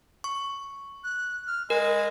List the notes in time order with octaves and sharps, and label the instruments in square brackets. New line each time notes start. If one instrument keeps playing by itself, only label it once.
[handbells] C#6
[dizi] F#6
F6
[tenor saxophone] G#3 [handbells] A#4 [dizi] G#5